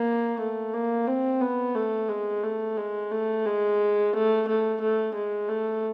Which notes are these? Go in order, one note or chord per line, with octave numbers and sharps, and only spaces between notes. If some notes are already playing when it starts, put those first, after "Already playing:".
Already playing: A#3
A3
A#3
C4
B3
A3
G#3
A3
G#3
A3
G#3
A3
A3
A3
G#3
A3